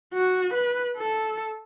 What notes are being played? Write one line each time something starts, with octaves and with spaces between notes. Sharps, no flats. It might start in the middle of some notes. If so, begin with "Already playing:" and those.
F#4
B4
A4